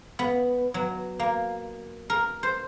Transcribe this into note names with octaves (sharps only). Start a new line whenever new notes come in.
B3
F#3
A#3
A#4
C5